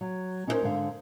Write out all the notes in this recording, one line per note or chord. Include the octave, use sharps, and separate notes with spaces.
F#3
C#4 D#4 E4 G#4 A#4 C5
G#2 D3 F5